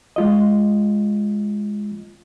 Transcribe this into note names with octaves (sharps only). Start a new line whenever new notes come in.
G#3 F4 D#5